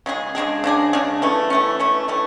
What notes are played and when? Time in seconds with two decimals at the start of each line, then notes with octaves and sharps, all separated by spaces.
0.06 C#3 G#3 D4 G#4
0.35 C#3 G#3 D4 G#4
0.64 C#3 G#3 D4 G#4
0.93 C#3 G#3 D4 G#4
1.22 E3 A3 C#4
1.50 E3 A3 C#4
1.79 E3 A3 C#4
2.08 E3 A3 C#4